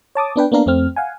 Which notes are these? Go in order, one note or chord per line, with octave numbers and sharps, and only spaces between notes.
C#5 A5 D6 D#6
B3 D4 B4 G5
A#3 B3 D4 A#4 F5
F2 A3 C4 F6
F5 F#5 G#5